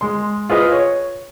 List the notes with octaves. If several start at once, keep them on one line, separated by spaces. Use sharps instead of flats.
G#3 C6
F4 G#4 B4 D#5
C#5